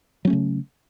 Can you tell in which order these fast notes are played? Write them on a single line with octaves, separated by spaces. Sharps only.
F#3 C#4 A3 C#3